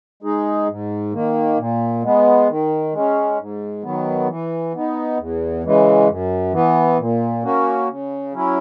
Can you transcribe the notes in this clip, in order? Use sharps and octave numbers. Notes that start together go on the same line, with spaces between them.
G#3 D#4 G#4
G#2
D#3 A#3
A#2
G#3 B3
D#3
G#3 C#4
G#2
D#3 F#3 B3
E3
B3 D#4
E2
C#3 E3 G#3
F#2
E3 B3
A#2
A#3 C#4 F#4
C#3
F#3 C#4 E4